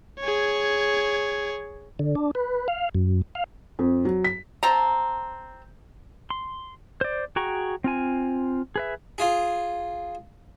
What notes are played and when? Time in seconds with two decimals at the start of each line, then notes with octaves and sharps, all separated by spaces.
0.20 G#4 C#5
1.99 D3
2.15 D4
2.35 B4
2.68 F5
2.95 F#2
3.35 F5
3.79 F2
4.05 F#3
4.24 B6
4.63 C4 A5 A#5
6.30 C6
7.01 C5 D5
7.36 F#4 G#4 G5 A#5 C#6
7.84 C4 F4 G#5
8.76 G#4 B4 E5
9.18 F4 G#4